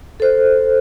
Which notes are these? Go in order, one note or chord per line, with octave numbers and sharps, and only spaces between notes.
A4 C5